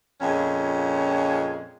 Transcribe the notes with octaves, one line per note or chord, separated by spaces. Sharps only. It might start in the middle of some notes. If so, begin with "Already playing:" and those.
F2 A#2 G#3 C#4